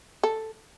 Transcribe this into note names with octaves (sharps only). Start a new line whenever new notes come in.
A4